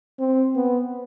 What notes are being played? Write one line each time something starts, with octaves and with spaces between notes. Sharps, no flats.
C4
B3